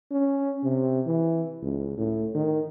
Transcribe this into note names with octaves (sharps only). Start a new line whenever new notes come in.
C#4
C3
E3
C#2
A2
D#3